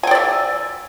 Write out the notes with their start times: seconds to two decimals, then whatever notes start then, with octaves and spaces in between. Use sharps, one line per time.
0.03 G#5
0.07 G5
0.11 D5
0.15 E5